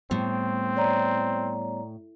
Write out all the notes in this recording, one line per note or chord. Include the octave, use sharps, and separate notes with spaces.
A2 G3 B3 C4
C#5 D5 A#5